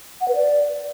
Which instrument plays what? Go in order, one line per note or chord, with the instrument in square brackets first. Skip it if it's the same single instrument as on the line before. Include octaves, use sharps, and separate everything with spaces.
[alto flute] F#5
B4
D5